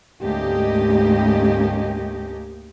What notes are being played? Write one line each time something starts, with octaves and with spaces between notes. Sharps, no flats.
D2 G#2 A#3 C#4 G4 D#5